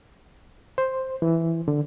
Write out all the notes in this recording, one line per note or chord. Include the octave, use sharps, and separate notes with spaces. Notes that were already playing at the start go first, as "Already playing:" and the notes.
C5
E3
D3